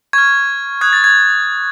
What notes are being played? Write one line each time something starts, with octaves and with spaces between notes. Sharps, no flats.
C#6 F6 G#6
D#6 F#6 G#6
A6
G#6